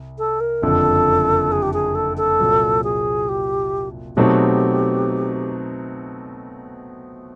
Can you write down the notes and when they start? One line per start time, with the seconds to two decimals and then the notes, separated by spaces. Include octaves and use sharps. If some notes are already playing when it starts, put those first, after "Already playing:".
Already playing: C2
0.18 A4
0.40 A#4
0.62 F#1 F2 D3 A4
1.52 G#4
1.62 G4
1.73 G#4
1.95 A4
2.17 A4
2.40 C2 A#2 F#3
2.84 G#4
3.29 G4
4.17 B2 F#3 A3 C4 D#4 G4